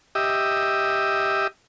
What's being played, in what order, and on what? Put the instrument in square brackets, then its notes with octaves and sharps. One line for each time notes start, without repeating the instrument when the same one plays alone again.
[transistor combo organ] G4 D#5 E5